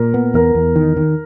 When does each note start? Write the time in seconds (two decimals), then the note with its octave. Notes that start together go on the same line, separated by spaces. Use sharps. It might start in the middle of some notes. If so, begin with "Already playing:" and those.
Already playing: A#2 A#4
0.14 B3
0.34 E2 A#4
0.55 E2
0.76 D#3
0.97 D#3